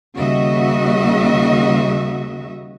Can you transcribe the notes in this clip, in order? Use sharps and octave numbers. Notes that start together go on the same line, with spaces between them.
D#2 C#3 G3 F#4 D#5 E5